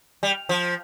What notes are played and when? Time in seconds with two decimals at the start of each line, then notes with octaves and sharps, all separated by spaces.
0.23 G3
0.49 F3